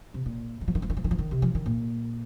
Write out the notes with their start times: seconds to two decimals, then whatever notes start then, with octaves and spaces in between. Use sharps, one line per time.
0.14 C3
0.26 A#2
0.61 D#3
0.68 F3
0.75 D#3
0.82 F3
0.90 D#3
0.97 F3
1.04 D#3
1.11 F3
1.19 D#3
1.31 C3
1.42 F3
1.55 D#3
1.66 A#2